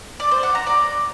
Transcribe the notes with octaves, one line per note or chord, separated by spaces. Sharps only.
D5
C5
F#5
A#5
D5